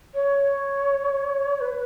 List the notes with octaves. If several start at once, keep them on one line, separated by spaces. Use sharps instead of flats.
C#5
B4